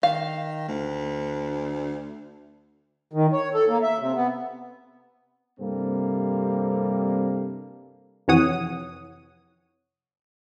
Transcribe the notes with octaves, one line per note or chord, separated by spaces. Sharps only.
D#3 F5
D2
D#3
C#5
A4
A#3
E5
C3
B3
G2 C3 G3 A#3 C4 A4
F2 C3 E3 C#5 F#5 D#6